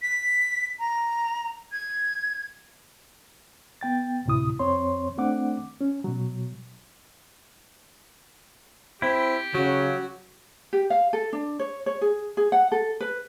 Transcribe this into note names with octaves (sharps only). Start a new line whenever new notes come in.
B6
A#5
G#6
B3 G5 A6
D2 A2 C3 E4 D#6
F2 C4 C#5 C6
A3 C4 D4 F#5 D6
C#4
B2 F#3
C4 E4 G4
C#3 F#3 F#4
G4
F5
A4
D4
C#5
C#5
G#4
G#4
F#5
A4
B4